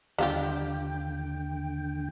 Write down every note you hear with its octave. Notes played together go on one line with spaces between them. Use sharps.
D#2 D3 G3 F4 G4 G5